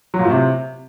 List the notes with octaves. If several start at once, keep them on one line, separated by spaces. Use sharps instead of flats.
F#3
A#2
A2
C3